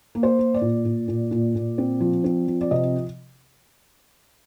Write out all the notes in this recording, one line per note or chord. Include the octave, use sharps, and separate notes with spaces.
A#3
C5
A#3
D5
A#2
A#2
A#2
A#2
A#2
C4
F3
C4
F3
D5
C3 D#5